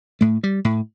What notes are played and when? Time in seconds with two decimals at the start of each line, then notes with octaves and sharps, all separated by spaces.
0.21 A2 A3
0.44 G3
0.65 A2